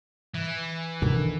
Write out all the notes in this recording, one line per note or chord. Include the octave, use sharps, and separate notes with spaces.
E3
D3 D#3